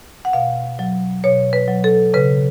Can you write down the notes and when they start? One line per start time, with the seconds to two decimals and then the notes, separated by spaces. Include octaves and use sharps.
0.25 F#5
0.33 B2 F5
0.79 F#3
1.24 B2 C#5
1.53 B4
1.68 F#3
1.84 A4
2.14 C#3 B4